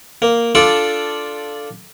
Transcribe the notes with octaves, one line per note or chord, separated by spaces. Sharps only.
A#3
D4 F4 A4 D5